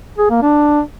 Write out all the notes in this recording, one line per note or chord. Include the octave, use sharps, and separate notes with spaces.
G#4
A#3
D4